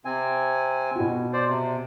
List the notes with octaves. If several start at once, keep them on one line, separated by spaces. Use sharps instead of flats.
C3 C4 G#5
B2 F#4
C5 D5
C3